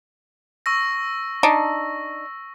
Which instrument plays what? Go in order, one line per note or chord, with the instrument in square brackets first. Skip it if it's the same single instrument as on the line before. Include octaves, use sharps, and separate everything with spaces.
[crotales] C#6 E6 A#6
[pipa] D4 D#4